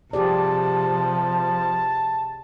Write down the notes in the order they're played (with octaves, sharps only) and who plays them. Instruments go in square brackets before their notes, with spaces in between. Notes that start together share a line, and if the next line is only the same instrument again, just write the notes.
[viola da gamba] C3 [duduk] F3 [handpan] G4 G#4 D5 [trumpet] A5